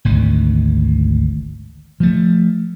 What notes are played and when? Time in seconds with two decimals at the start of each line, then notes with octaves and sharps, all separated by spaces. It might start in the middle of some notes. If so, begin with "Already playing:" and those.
0.05 G#1 D2 D#3
2.00 F3 A3